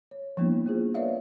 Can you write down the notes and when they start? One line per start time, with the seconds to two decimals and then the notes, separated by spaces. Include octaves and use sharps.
0.11 C#5
0.37 F3 G3 A#3 B3 D4 E4
0.66 A#3 F4 G#4 C5
0.94 A#4 B4 C#5 D5 E5 F5